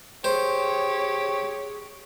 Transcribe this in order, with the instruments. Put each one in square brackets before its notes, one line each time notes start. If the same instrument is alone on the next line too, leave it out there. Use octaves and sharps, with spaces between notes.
[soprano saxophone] G4 [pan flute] G#4 [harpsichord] C5 [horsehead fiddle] C#5